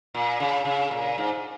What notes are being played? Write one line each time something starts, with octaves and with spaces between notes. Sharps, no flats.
A#2
C#3
C#3
A#2
G#2